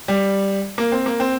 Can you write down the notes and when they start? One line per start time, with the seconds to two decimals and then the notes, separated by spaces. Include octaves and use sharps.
0.08 G3
0.78 A#3
0.92 C4
1.06 A#3
1.20 C4